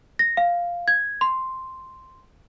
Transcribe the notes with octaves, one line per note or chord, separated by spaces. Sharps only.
A#6
F5
G#6
C6